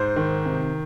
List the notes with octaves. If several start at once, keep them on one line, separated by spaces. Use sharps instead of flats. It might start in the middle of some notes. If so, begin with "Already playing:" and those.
Already playing: G#2 C5
D#3
C3